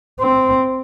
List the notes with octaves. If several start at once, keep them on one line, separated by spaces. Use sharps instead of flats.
C4